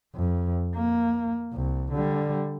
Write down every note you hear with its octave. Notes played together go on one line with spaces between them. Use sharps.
F2
A#3
C2
D3 G3